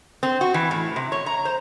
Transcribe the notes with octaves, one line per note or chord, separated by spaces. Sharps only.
C4
F#4
E3
A2
C3
C#5
A#5
C5